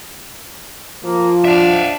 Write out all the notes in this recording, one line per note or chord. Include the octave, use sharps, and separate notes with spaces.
F3 A#3
D4 E5 F5